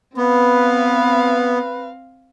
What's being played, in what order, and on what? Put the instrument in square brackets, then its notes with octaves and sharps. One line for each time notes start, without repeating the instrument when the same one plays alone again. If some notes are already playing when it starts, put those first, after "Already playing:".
[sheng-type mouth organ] B3 [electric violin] C4 F5 [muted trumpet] B4